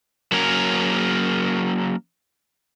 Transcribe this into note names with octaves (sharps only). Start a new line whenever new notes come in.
F#3 A#3 C#4 A#4